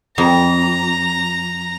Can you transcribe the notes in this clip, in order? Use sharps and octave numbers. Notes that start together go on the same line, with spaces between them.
F2 A#5